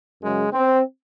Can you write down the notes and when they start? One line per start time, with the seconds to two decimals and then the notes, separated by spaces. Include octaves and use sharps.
0.22 F#2 C#3 F#3 G#3
0.53 C4